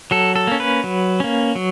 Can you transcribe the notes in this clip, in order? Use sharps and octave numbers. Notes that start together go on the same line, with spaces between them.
F#3 A4
A4
A#3 C#4
B4
F#3
A#3 C#4
F#3